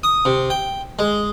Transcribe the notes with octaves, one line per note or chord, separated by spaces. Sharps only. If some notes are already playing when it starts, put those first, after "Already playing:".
D#6
C3
G5
G#3